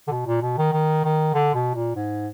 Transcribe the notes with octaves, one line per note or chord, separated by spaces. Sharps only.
D3
B2
A#2
B2
D#3
D#3
D#3
D3
B2
A#2
G#2